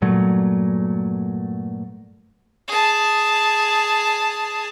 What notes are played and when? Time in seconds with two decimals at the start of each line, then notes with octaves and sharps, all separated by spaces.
0.02 G2 A#2 F#3 A3
2.68 G#4 A5